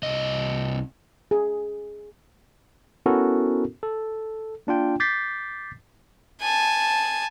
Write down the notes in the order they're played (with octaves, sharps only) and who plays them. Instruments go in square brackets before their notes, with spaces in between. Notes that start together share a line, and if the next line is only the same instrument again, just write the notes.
[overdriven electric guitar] C2 D#5
[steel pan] G#4
[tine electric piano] B3 C#4 E4 F#4 A4 A#4
A4
A#3 D4 F4 G5
D6 G6 A6 B6 C7
[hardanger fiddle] G#5 A5